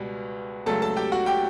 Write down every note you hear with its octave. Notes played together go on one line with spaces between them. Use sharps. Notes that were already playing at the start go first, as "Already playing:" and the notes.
Already playing: C#2 B2 G3 F#4
C#2 C#3 F#3 A3 A4 A5
A4 A5
G4 G5
F#4 F#5
G4 G5